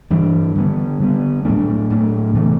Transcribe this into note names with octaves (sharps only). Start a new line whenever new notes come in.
G2 E3 G3 D4
D3 G3 B3
D3 G3 B3
A2 F#3 A3 D4
A2 F#3 A3 D4
C3 E3 A3